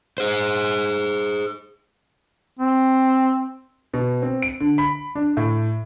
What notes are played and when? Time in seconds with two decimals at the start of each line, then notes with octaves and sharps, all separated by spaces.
0.18 G#4 C5
2.59 C4
3.93 B2
4.22 C4
4.42 D7
4.60 D3
4.78 B5
5.15 D4
5.37 A2